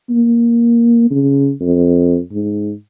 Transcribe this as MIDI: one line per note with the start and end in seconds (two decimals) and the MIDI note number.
0.10 1.07 58
1.11 1.51 49
1.61 2.18 41
2.32 2.73 44